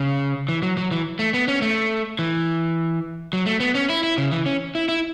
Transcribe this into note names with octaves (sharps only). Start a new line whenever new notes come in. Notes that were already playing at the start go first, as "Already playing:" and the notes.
Already playing: C#3
E3
F#3
F#3
E3
A3
B3
C#4
A3
E3
F#3
A3
B3
C#4
E4
E4
C#3
E3
C#4
E4
E4